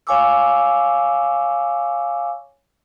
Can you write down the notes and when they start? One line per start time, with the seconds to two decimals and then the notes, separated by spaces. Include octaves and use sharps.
0.07 C#5 F5 G#5 C#6 D6 E6